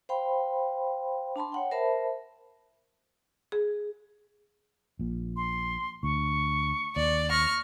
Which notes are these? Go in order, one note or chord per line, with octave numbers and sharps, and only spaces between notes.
C5 F5 G5 B5 C6
D4 A5 B5 C6
C#5 F#5 G5
A#4 C5 E5 A5 B5
G#4
A#1 A#2
C6
D2 C#6
D#2 D5
C#6 F6 A#6